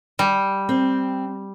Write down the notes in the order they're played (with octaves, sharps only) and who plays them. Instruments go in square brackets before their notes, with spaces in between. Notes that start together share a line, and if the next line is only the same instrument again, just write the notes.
[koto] G3
[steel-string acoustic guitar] C4